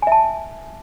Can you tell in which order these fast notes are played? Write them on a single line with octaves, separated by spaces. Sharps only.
G#5 E5 A5